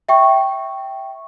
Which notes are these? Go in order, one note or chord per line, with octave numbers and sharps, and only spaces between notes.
E5 G5 C#6